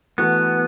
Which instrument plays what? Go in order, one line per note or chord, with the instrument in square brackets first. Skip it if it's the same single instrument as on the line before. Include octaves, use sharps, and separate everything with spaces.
[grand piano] E3 A3 F#4 A4 [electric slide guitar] B3